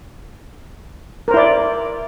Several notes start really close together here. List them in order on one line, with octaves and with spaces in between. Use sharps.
A#4 C5 E4 D5